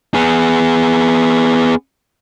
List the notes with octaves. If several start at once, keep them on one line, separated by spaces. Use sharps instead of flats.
B3 G#4